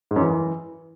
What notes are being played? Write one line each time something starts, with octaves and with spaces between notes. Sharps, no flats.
G#2
F#2
E3